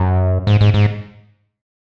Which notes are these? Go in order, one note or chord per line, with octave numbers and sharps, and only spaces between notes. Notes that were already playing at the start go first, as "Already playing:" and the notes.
Already playing: F#2
G#2
G#2
G#2